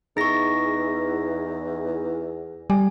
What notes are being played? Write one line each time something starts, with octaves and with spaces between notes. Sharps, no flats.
E2 D#4 G#4 C#6 A#6
G3 G#5